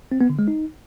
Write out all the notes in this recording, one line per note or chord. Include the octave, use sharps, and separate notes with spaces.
C4
B3
D3
G#3
D#4